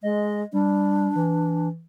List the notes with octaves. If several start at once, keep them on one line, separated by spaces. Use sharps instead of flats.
G#3 D#5
G3 D4
E3